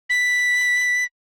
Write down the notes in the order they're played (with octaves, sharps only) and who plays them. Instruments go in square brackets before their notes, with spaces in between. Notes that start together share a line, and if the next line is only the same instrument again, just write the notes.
[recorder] B6